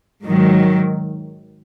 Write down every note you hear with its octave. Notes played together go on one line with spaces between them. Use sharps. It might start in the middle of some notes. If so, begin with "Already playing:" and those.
G#2 D#3 F#3